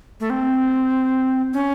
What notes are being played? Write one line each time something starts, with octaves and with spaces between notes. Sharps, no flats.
A3
C4
C#4